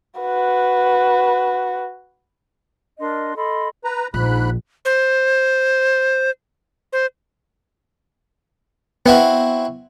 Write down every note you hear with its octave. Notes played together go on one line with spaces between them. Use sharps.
F#4 B4
D4 A#4 D#5 C6
A4 D#5 B5 C6
B4 A#5
A#1 G#2 B5 F#6
C5
C5
B3 C4 E4 F#4